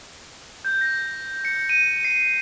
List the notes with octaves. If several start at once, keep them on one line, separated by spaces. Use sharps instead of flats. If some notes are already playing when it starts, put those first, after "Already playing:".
G6
A#6
C#7
D#7
C7